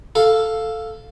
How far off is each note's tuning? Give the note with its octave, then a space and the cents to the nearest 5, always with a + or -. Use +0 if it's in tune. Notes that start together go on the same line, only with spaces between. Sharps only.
A4 +0 F5 +0